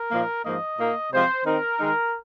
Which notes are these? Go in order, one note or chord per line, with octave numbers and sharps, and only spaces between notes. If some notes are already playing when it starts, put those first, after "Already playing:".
Already playing: A#4
A#2 F3 A#3 D#4
G#2 F3 A#3 D#4 D#5
A#2 A#3 D#4
C3 F3 G#3 C4 C5
D#3 C4 D#4 A#4
D#3 G#3 D#4